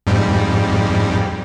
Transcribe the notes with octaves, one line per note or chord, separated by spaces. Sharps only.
F2 G#2 G3